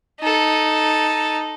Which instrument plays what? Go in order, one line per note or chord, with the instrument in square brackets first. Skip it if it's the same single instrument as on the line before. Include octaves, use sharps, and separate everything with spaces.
[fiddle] D#4 A4